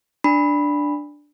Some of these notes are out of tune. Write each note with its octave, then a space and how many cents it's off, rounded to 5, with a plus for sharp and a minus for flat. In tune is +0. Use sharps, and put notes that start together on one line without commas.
D4 +0 B5 +0